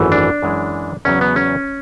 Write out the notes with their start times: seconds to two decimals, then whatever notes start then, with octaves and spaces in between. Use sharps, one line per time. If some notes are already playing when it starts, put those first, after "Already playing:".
Already playing: G#1 F#2 E3 A3
0.12 D4
0.42 F#2 E3 G#3
1.05 E2 C#3 F#3 C#4
1.21 B3
1.36 C#4